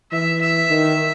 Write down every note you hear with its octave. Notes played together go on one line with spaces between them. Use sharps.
E3 E5
E5
D#3